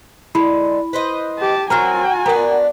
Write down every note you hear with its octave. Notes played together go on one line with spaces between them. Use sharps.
D3 G#3 E4 B5
B4 C5 D#5
G4 A5
F#3 C4 F#4 A#4 G#5 A#5 F6
B3 D4 A#4 A#5